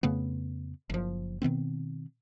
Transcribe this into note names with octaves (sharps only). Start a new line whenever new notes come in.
F2 C#3 A3 B3
F#1 F3
B2 D#3 B3 C4